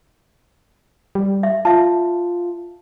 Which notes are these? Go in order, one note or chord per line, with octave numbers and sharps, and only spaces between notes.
G3
E5
F4 E5 A5